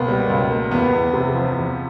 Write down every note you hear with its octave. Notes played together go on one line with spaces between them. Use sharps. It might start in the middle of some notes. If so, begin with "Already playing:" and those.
Already playing: C#2 B2 A#3 B3
G3
C#2
A#3
E2 B3
E2
C3
F3
E2